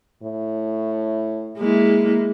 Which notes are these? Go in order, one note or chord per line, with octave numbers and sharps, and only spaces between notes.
A2
G#3 A#3 E4